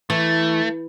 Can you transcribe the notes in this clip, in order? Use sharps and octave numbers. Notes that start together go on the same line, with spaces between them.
E3 A3